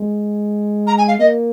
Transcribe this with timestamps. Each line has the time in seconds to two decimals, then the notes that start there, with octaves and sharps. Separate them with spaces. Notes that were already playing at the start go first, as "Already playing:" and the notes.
Already playing: G#3
0.87 A#5
0.98 G#5
1.08 F5
1.19 A#3 D#5